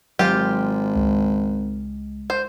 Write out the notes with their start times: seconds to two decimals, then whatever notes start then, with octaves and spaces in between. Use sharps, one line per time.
0.19 G#1 F#3 F4 G4
0.96 C#2 G#3
2.30 C5